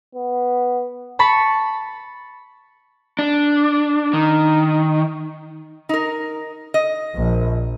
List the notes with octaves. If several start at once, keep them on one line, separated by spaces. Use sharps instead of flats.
B3
A5 B5 C#6
D4
D#3
D#4 A#4
D#5
A#1